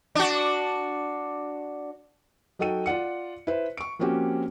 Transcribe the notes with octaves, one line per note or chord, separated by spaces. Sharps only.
D4 F#4
F#3 D#4 F#4 A4 G5 D#7
F4 D5 F#5 C#7
E4 B4 C5
C#6 D7
F3 A#3 C4 C#4 F#4 G4